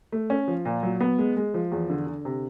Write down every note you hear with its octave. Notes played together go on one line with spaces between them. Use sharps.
A3
C#4
F3
A#2
F#3
B3
G#3
G#3
F3
E2
D3
D3
C3